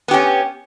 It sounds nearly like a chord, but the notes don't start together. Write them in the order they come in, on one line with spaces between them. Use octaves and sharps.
B3 G4 C#4